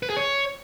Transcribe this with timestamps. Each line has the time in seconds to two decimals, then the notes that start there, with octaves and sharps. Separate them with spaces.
0.03 B4
0.10 G#4
0.17 C#5